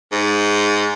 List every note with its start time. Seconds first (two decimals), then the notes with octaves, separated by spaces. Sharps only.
0.12 G#2